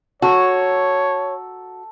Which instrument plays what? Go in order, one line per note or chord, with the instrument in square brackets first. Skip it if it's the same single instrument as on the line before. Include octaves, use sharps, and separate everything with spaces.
[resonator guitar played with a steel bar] F#4 [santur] A4 A#5 E6 [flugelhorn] C#5